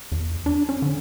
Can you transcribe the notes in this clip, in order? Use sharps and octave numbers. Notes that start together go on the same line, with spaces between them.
E2
D4
C#4
D3